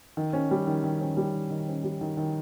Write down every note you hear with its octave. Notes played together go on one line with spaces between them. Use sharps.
D#3
C#4
G3
D#3
D#3
C#4
G3
D#3
D#3
C#4
G3
D#3
D#3